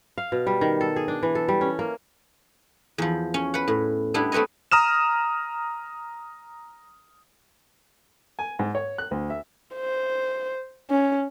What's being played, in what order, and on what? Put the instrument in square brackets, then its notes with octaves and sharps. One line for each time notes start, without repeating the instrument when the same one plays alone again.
[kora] F5
B2
G3
D#3
A4
G#4
D4
E3
A4
G3
C#4
A#3
[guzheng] E2 F3
C#4
B4 F#5
A2
G3 B3 D4 E4
A3 C4 B4 C#5 D#5
[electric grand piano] A#5 D#6 F6 E7
[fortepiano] G#5
G#2
C#5
F#6
D2
E5
[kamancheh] C5
C#4